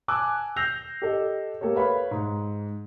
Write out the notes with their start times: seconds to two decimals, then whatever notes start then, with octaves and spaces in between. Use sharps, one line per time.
0.08 G#5 A5 D6 E6 F#6
0.56 E6 G6 A#6 C7 F7
1.02 G4 A4 D#5
1.61 A#3 G4 A4 A#4 C#5
1.76 B4 C#5 F5 B5
2.11 G#2